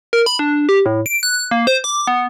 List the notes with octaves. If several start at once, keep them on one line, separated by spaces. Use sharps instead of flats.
A#4
B5
D4
G4
A2
D7
F#6
A#3
C5
D6
B3